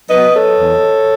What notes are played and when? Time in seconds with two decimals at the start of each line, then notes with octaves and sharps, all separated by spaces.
0.09 F#3 B3 B4 D#5
0.33 A4 C#5
0.58 E2